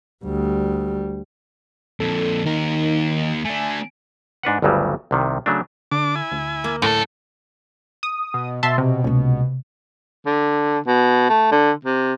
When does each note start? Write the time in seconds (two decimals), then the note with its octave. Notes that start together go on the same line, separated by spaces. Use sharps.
0.24 D2 G3
2.00 F2 A#2 A4
2.46 D#2 D#3 A#4
3.45 A3 D4 G#5
4.43 G#2 D4 B4 F#5
4.62 G1 D2 G2 C#3 F#3 G3
5.11 C2 C3 D#3
5.46 C#3 F#3 A3 D4
5.92 D3 D4 D6
6.15 E4 G#5
6.32 D2
6.64 A#3
6.82 F#2 A2 A4
8.03 D#6
8.34 B2
8.63 B2 E5 A5 C6
8.78 C3
9.04 C#2 C3 A#3
10.26 D3
10.87 B2
11.30 A3
11.52 D3
11.85 C3